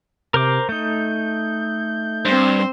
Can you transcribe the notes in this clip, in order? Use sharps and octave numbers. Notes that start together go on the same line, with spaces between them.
C3 A#4 C5 D6
A3 D#4 G6
G2 C4 C5